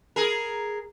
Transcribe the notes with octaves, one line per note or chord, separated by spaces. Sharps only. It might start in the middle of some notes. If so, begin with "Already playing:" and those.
G#4 A#4